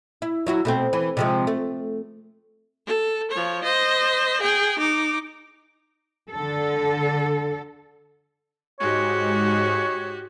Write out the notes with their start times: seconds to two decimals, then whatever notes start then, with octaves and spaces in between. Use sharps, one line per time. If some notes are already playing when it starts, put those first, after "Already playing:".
0.22 E4
0.47 F#3 E4 F#4
0.65 B2 A3 C4
0.93 E3
1.17 C3 F3 G#3
1.47 A3
2.86 A4
3.31 F3 C#5
3.63 C5 D#5
4.41 G#4 G5
4.79 D#4 D6
6.31 D3 A4
8.80 G#2 G#3 F#4 G4 C#5